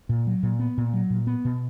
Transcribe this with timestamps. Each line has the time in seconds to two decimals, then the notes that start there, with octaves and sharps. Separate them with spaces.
0.09 A#2
0.27 F#3
0.43 A#2
0.60 B3
0.78 A#2
0.94 F#3
1.10 A#2
1.27 B3
1.45 B2